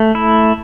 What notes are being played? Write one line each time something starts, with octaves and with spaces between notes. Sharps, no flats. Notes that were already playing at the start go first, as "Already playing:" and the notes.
Already playing: A3
E4